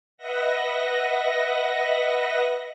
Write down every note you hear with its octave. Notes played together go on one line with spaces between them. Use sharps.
B4 D#5 E5 F#5 A#6